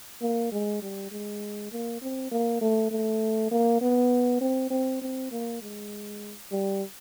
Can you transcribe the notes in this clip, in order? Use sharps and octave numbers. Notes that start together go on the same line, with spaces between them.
A#3
G#3
G3
G#3
A#3
C4
A#3
A3
A3
A#3
B3
C4
C4
C4
A#3
G#3
G3